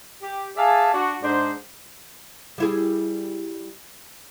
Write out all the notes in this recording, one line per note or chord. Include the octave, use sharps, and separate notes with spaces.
G4
G#4 D5 E5 F5 G#5 A5
D4 F#4
G#2 D4 C5
G3 E4 G#4